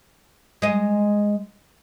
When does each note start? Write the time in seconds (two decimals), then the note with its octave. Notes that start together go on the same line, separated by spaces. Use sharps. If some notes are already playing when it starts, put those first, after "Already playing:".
0.62 G#3 D#5